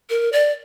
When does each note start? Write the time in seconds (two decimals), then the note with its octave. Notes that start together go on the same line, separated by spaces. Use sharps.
0.10 A#4
0.32 D5